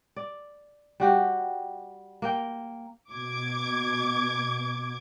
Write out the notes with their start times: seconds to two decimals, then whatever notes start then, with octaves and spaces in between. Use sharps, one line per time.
0.16 D5
1.00 G3 F#4 G4
2.22 A#3 A#4 G5
3.11 B2 D6 G#6